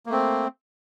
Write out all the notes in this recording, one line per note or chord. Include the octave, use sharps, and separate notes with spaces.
A3 A#3 C4